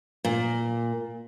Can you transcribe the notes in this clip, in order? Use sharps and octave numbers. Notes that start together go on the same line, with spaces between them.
A#2